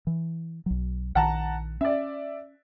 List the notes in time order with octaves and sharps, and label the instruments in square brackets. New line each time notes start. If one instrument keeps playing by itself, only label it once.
[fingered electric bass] E3
B1 F#3
[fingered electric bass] A#1 D#3 [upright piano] F#5 A5 A#5
[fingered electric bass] C#4 [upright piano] D5 E5